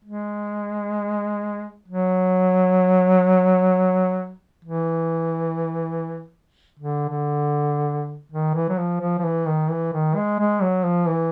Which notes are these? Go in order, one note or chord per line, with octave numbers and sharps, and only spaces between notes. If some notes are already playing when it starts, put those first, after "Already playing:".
G#3
F#3
E3
D3
D3
D#3
E3
F#3
F3
F3
F3
E3
D#3
E3
D#3
G#3
G#3
F#3
F3
E3